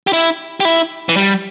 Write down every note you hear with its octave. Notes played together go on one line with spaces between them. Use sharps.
G4
E4
G4
E4
E3
G3